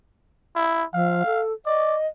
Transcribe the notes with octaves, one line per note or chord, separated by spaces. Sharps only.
E4
F3 F5
A4
D5 D#5